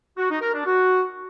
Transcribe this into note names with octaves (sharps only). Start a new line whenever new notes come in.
F#4
D#4
A#4
D4
F#4